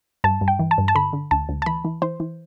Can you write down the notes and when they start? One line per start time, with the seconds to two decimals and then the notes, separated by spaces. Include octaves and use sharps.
0.24 G2 A5
0.41 G2
0.48 G5
0.59 E3
0.71 A5
0.78 G2
0.88 A5
0.95 D3 B5
1.13 D3
1.31 D2 A5
1.49 D2
1.62 A5
1.66 E3 B5
1.85 E3
2.02 E3 C5
2.20 E3